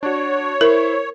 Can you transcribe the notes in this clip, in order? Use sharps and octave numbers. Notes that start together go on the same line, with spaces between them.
D4 F#4 C#5
E4 A#4 C5